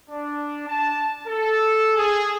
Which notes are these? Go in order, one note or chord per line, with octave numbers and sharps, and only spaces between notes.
D4
A5
A4
G#4